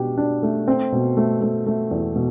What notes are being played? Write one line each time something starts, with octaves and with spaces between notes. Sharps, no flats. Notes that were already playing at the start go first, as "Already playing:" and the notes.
Already playing: B2 D4 G4
D4
A3
C4
B2
A3
A3
A3
E2
B2